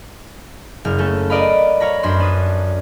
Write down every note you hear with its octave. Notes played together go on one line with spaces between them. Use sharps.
F#1 F6
A3 C#4 A4
A#4 B4 D5 D#5 F5 B5
C#5 F5 A#5 B5
F#2 D4 C5 B5 C6
D4 B4 D#6